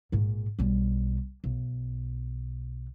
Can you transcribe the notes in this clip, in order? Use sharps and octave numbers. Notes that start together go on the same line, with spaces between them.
A#1 G#2
B1 G3
B1